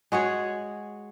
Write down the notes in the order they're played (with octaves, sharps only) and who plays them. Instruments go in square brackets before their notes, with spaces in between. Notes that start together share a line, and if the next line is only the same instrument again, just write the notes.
[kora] G#3 F#4 G#4 C#5